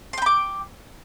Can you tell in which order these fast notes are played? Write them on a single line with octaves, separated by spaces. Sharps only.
C6 G5 B5 D6